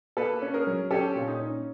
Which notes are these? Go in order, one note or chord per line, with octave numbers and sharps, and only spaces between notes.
A#3 A4 B4
C#4
G#4 A#4
F#3
C#4 G4 A4
A#2
D#4
C#4